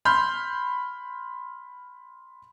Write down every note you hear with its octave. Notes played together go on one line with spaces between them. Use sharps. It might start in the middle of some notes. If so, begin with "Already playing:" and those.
B5 C6 F6 G6